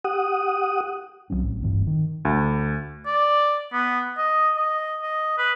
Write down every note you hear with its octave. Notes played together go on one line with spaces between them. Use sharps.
G4 F#5 D#6
B1 F#3 C4 C#4
A1
D#1 G2 E3 C4
D#3
D2
D5
B3
D#5
D#5
D#5
B4